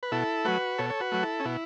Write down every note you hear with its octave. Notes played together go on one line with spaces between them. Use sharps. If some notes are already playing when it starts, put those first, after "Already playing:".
B4
B2 E4 A4
F#3 A3 F#4 B4
B2 A4 C#5
C#5
F#4 B4
F#3 A3
E4 A4
C#4
B2 E4